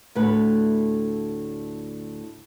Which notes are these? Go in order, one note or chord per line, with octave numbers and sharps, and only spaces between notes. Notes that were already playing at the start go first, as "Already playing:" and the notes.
D2 A2 B4